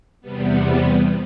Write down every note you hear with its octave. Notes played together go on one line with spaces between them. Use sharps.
E2 C3 G3 B3